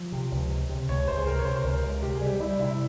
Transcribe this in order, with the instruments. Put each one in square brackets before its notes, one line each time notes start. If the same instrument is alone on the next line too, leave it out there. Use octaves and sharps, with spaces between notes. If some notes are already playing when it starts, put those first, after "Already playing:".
Already playing: [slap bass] F3
C3
C#2
C3
C3
[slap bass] C#2 [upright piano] C#5
[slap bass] C#2 [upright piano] C5
[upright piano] G#4
[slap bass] C3 [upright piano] A#4
[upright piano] C#5
[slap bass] C3 [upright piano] C5
[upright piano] C5
[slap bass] C#2 [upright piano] A#4
[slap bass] C#2
[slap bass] C3 [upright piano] G4
[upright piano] G#4
[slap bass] G3
[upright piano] G4
[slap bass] G3 [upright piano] E4
[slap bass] C3 [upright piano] E4